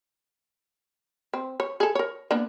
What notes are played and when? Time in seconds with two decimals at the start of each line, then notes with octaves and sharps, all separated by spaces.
1.34 C4
1.60 C#5
1.80 G#4 A4
1.95 A#4 C#5
2.31 A#3 B3 D4